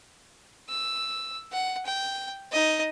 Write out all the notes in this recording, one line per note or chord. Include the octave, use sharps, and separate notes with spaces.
E6
F#5
G5
D#4 D#5